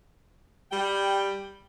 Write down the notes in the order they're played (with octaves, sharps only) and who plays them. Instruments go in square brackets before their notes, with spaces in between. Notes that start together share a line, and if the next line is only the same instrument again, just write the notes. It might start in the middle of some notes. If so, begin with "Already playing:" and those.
[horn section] G3 G5